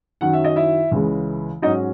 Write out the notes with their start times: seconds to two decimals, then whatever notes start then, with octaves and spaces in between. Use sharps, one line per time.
0.21 F#2 D#3 F#3 F#5
0.33 E5
0.44 D#5
0.56 E4 E5
0.91 C#2 C#3 E3 G#3
1.62 G#2 F#3 C#4 D#4 D#5